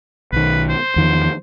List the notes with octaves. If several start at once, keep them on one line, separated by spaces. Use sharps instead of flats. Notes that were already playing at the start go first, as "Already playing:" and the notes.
B1 D#3 B4
C5
E2 D#3 F3